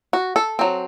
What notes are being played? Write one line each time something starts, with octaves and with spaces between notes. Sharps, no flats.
F#4
A4
F#3 C4